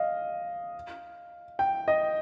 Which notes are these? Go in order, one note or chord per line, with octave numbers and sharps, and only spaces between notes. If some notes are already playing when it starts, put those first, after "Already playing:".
Already playing: D#5 F5
G5
D#5